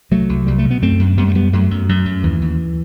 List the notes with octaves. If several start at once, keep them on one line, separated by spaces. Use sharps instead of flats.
C2 F#3 A3
C2
C2 G3
A3
B2
B3
F#2 A3 C4
F#2
F#2 G3 B3
A3
F#2 G3 B3
F#2 F#3 A3
F#2
F#2
F#2
D#2 E3
D#2